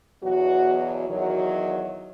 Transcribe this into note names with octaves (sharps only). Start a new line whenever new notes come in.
E2 B2 F#3 F#4
E2 D#3 F#3